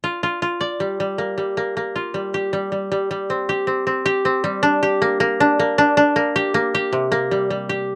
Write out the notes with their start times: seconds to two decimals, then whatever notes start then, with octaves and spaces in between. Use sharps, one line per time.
0.04 F4
0.23 F4
0.42 F4
0.61 D5
0.80 G3
1.00 G3
1.18 A#3
1.38 G3
1.57 A#3
1.77 A#3
1.96 F4
2.14 G3
2.34 G4
2.53 G3
2.72 G3
2.92 G3
3.11 G3
3.30 C4
3.49 G4
3.67 C4
3.87 C4
4.06 G4
4.25 C4
4.44 G3
4.63 D4
4.83 G4
5.02 A#3
5.20 A#3
5.40 D4
5.59 A#3
5.78 D4
5.97 D4
6.16 A#3
6.36 G4
6.54 A#3
6.75 G4
6.93 C3
7.12 A#3
7.31 G3
7.50 G3
7.69 G4